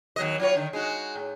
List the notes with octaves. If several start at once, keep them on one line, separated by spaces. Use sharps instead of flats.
D#2 F#3 D#5
F#3 F4 C#5
D3 D#3
G#3 D#4 F#4
A2